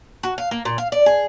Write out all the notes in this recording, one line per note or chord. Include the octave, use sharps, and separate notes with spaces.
F#4
F5
A#3
A#2
F5
D5
G#4